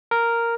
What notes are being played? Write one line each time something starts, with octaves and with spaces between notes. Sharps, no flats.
A#4